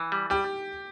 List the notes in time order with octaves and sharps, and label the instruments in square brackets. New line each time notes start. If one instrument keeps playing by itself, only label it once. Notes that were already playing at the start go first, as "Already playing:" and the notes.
Already playing: [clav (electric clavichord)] E3
G3
[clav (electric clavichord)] G3 [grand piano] G4